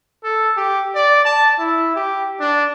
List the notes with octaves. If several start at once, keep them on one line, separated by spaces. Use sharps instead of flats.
A4
G4
D5
A5
E4
G4
D4